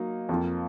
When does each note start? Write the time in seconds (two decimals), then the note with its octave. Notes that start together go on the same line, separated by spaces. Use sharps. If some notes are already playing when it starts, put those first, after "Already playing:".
Already playing: F#3 A#3 D#4
0.29 F2 F3 A#3 F4